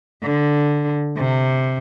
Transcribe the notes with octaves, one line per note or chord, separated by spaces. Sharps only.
D3
C3